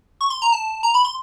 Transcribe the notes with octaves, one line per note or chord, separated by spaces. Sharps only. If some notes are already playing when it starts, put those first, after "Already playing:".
C#6
C6
A#5
A5
A#5
B5
C6